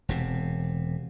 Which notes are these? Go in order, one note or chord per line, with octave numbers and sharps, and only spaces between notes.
E1 C3